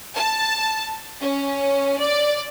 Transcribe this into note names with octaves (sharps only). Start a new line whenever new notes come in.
A5
C#4
D5